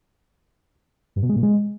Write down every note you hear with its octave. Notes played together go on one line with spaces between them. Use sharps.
G2
B2
G#3
A#2
G#3